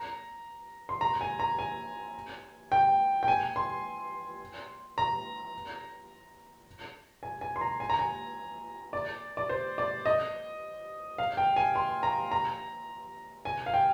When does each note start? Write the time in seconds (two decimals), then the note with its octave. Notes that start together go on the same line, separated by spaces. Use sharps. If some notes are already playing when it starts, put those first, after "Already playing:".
Already playing: A#5
0.89 C6
1.01 A#5
1.21 G#5
1.40 A#5
1.59 G#5
2.72 G5
3.23 G5
3.28 G#5
3.56 C6
4.98 A#5
7.23 G#5
7.41 G#5
7.56 C6
7.61 A#5
7.80 G#5
7.90 A#5
7.99 G#5
8.93 D5
9.37 D5
9.49 C5
9.78 D5
10.06 D#5
11.18 F5
11.37 G5
11.56 G#5
11.76 C6
12.03 A#5
12.31 A#5
13.45 G#5
13.66 F5
13.74 G5